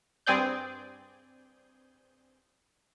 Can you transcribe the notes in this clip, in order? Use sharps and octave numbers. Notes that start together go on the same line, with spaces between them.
G2 C4 G#4 D5 G6